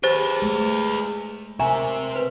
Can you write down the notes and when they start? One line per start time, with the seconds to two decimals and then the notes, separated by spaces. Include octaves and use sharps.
0.03 G4 G#4 B4 C5 A6
0.42 G#3 A3
1.59 C3 A#4 E5 G#5 A#5 C#6
2.16 B4